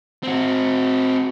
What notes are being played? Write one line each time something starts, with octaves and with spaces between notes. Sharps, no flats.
C4 F#4